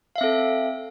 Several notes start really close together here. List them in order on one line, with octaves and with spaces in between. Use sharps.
F5 E5 C4 A4